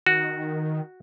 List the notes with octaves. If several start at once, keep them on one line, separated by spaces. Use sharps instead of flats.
D#3 F#4